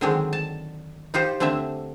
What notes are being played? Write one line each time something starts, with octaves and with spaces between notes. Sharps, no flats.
D3 D#3 F#3 G#3 C4 D4
A5
D#4 F4 G4 C5
D3 A3 C4 D4 E5